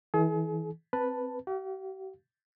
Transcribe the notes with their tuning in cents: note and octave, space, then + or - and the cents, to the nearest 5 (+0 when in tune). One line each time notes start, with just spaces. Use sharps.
E3 -30 G#4 +40
C4 +0 B4 +0 A5 +5
G4 -45 F5 -5